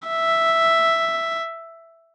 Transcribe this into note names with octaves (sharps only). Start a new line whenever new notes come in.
E5